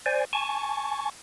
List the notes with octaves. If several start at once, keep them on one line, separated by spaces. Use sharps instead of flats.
C5 D5 G#5
G#5 A5 C#6